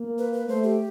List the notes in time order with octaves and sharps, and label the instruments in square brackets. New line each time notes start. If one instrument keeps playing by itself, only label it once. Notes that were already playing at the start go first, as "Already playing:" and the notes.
Already playing: [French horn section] A#3
[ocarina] B4
B4
[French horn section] A3 [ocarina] C5
[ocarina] G4